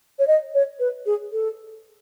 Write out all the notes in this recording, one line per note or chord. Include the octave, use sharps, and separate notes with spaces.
C#5
D#5
C#5
B4
G#4
A4